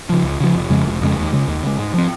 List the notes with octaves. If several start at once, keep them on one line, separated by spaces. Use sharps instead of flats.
C#3 F3
C#2
C#3 F3
F1
F2 C#3 G#3
F1
F2 C#3 G#3
D#2
C#3 G#3
D#2
C#3 G#3
G#2
F3 C4